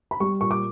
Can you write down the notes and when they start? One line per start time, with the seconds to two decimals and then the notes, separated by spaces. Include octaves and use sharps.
0.11 B5
0.20 G3 C#6
0.40 A#2 C#6
0.51 D6